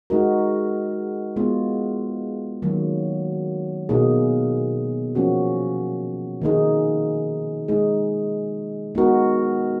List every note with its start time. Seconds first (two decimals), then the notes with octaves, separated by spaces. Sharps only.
0.10 G#3 D#4 F#4 A#4
1.36 G#3 B3 F4
2.62 D#3 F#3 A#3
3.89 B2 A#3 D#4 G#4
5.15 F3 A#3 C#4 F#4
6.41 D#3 A#3 D#4 G#4
7.68 G#3 D#4 G#4
8.95 G#3 B3 D#4 F#4 A#4